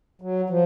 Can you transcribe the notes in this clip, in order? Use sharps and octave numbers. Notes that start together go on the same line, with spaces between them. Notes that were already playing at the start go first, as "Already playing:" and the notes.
F#3
F3